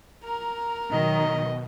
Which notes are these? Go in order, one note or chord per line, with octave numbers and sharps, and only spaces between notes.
A#4 A#5
B2 D#3 F#3 D#5